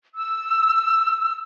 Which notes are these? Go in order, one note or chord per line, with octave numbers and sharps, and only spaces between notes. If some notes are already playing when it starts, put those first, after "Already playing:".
E6